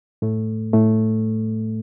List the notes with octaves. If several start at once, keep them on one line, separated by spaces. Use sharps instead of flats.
A2 A3
A2 A3